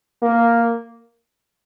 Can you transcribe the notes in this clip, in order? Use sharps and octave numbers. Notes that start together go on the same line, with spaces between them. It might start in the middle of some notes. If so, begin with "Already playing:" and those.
A#3